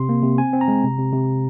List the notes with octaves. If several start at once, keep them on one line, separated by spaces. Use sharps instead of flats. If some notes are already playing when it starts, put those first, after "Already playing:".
Already playing: C3 C6
A#3
C3
C4 G#5
C4
A#5
G#3
C3
C3
C3